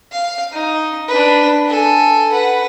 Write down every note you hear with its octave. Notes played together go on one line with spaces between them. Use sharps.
F5
D#4
D4 B4
A4 G#5
B4 F#5